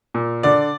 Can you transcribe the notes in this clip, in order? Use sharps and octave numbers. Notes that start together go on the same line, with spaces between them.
A#2
D3 D5